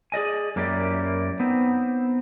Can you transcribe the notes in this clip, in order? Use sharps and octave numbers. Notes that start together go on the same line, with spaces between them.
G#4 D5 D#5 G#5
F#2 A#3 E4 G4 D5
B3 C4 D#4